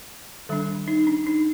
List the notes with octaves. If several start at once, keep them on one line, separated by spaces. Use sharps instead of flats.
D#3 G3 D4 A4
D#4
D4
D#4